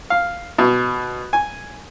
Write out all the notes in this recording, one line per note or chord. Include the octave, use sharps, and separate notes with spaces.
F5
B2
G#5